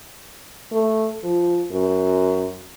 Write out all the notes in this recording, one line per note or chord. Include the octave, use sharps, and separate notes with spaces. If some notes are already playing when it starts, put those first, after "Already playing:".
A3
F3
F#2